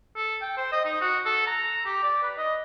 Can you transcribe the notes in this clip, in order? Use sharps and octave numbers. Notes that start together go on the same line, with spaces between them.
A4
G5
C5
D#5
D#4
F#4
A4
A#5
G4
D5
B4
D#5